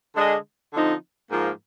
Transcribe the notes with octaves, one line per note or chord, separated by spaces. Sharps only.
D3 G#3 D4 G#4 D#5
D3 F3 C4 D#4
G#2 F3 A#3